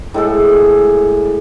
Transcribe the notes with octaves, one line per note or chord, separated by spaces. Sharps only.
A2 G#3 A4